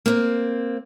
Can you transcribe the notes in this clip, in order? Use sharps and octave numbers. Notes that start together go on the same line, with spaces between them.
A#3 C4